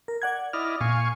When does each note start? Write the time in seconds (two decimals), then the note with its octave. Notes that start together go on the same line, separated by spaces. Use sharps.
0.08 A#4
0.22 D5 F#5 G#6
0.53 E4 D5 D#5 F6
0.81 A#2 F5 G#5 C#6